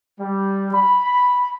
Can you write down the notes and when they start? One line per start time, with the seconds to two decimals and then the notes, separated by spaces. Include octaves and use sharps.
0.20 G3
0.74 B5